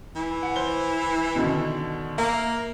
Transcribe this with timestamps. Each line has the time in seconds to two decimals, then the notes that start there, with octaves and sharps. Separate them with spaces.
0.16 E3
0.43 F#5
0.56 C5 G7
1.35 B2 D3 D#3
2.18 A#3 E5